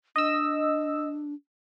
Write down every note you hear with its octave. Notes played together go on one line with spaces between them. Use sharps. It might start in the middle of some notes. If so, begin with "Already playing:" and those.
D4 D#5 E6